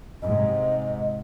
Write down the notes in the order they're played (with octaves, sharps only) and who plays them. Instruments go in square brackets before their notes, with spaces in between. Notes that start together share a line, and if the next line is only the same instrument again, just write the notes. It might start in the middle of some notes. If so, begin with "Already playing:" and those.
[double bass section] G#2 C3 [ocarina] D#5